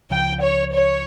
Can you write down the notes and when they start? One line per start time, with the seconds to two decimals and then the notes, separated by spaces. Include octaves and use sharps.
0.10 C#2 C#3 F3 G5
0.41 C#5
0.73 C#5